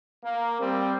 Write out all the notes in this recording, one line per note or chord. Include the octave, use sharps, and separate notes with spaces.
A#3
G3 C4